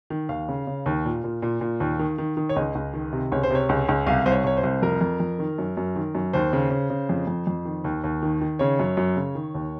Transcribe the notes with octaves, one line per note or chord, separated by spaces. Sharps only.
D#3
D#2 F5
C#3
C#3
D#2
A#2
A#2
A#2
A#2
D#2
D#3
D#3
D#3
C#5
C#2 D#5
C#2
D#3
C3
C#2 C#5
C5
C3 C#5
C#2
C#2
C2 F5
C2 C5
C#5
C2 C#5
C5
C2
F2 A#4
F2
F2
D#3
F#2
F#2
D#3
F#2
D#2 C5
C#3
C#3
C#3
F2
F2
F2
D#3
D#2
D#2
D#3
D#3
C#3 C#5
F#2
F#2
C#3
D#3
D#2